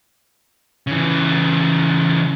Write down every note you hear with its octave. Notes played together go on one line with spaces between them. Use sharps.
C#3 E3